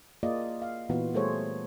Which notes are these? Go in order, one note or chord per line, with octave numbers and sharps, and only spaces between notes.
A#3 F4 G#4 D5 D#5
F5
A#2 E3 B3 F4 F#4
G3 A3 G#4 A4 C5 C#5